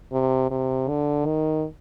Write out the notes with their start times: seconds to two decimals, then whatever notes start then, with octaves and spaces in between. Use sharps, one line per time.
0.13 C3
0.51 C3
0.88 D3
1.26 D#3